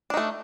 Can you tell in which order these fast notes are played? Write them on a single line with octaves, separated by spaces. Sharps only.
D4 D#4 A3